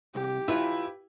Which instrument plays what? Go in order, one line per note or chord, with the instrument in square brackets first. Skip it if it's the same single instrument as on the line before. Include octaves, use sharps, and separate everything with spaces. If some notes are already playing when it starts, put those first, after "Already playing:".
[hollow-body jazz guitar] C2 [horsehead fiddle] G4
[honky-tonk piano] E4 [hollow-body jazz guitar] F4 B4